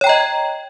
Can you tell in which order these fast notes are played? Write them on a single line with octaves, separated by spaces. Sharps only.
C#5 G5 A#5 D#5